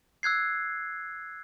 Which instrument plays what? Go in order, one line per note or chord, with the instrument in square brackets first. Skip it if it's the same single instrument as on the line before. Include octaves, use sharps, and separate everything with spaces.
[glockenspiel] E6 F#6 G#6 C7